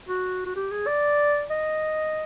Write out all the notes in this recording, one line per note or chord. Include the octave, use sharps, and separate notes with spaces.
F#4
F#4
G4
G#4
D5
D#5